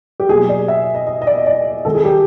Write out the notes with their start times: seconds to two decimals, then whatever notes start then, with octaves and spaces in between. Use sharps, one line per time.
0.20 G4
0.29 B2 F#3 A#3 G#4
0.49 D5
0.68 E5
0.95 D#5
1.07 D#5
1.22 D#5
1.27 D5
1.47 D5
1.85 C3 D#3 G#3 A4
1.95 G#4
2.05 G4